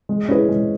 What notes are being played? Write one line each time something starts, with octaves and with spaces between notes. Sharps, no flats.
G#3
C#4 E4 G#4 B4
G#3